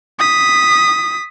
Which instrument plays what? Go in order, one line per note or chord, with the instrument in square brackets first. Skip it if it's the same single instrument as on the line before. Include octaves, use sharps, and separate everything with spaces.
[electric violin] D#6 B6